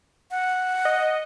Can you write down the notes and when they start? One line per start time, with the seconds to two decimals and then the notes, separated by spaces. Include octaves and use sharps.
0.31 F#5
0.85 D#5